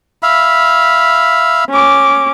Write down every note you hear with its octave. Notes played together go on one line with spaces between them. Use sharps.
E5 F5 B5
C#4 D6